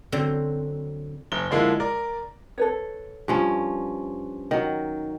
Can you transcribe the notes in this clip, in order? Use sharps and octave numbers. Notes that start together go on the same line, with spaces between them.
D3 F#3 C4
F#1 G7
D3 F3 G#3 A#3 E4
A#4 D5
A4 B4 C#5
G2 F3 C#4
D#3 F#3 D#5